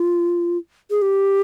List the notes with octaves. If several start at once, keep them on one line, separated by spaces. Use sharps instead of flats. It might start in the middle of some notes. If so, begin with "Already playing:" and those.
Already playing: F4
G#4
G4